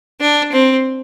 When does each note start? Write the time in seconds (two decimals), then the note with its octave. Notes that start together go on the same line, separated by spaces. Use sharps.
0.20 D4
0.52 C4